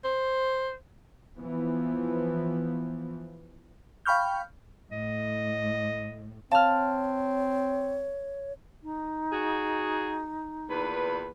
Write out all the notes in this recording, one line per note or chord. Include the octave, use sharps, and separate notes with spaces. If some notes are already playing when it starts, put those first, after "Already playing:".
C5
E3 F3 B3
F5 G5 B5 C#6 F6 G6
A2 D#5
C4 C#5 F5 A5 F6
D#4
F#4 G#4
E2 A#2 B4